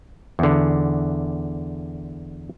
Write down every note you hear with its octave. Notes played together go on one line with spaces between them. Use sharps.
E2 D3